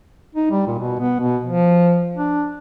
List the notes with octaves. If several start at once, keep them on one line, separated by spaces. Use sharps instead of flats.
D#4
G3
A#2
B2
B3
B2
F3
D4